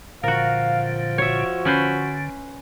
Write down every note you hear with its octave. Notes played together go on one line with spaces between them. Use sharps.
A#2 D3 F3 F#4 A#4 F5
F#4 C#5 E5
D3 C#4 B4 C5